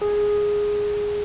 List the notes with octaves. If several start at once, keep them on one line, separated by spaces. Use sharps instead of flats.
G#4